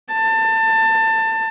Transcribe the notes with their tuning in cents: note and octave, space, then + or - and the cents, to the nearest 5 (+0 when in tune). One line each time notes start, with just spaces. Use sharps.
A5 +25